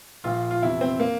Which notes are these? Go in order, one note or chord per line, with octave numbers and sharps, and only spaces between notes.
A#1 A#2 F3 F4
F4
E2 C3 E3 E4
C4
A#3